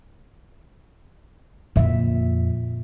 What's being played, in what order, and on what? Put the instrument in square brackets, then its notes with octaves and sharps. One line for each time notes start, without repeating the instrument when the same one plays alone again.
[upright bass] F2 [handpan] A#2 D3 E5